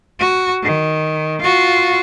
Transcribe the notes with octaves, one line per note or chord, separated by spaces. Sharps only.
F#4
D#3
F4 F#4